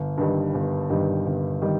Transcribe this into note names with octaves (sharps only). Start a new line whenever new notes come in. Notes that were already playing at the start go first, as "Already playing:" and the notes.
Already playing: G1
G2 D#3 G3
G1
G2 D#3 G3
G1
D#3 G3